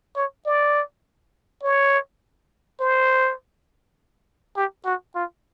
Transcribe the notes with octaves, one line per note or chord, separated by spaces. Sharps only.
C#5
D5
C#5
C5
G4
F#4
F4